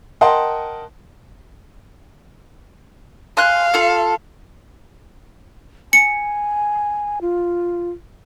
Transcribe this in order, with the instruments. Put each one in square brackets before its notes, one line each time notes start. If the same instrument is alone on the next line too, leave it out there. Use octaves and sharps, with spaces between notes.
[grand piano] A#4 D#5 F#5 G5 A5 C6
[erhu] F5 [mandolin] G#5 C6 F#6
[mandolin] F4 A4
[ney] G#5 [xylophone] C#7
[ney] F4